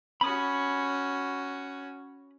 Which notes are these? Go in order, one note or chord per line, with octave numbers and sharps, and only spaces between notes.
C#4 F#4 B5 D#6